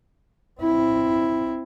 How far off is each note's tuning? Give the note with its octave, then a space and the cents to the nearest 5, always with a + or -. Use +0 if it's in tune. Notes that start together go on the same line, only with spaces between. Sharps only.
C4 +0 E4 +0